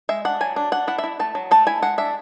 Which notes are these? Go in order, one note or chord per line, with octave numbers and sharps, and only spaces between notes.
G#3 E5
D4 F#5
F#3 G#5
D4
D4 F#5
E4 F#5
E5
E4
A3 A5
F#3
A3 A5
E4 G#5
G#3 F#5
D4 E5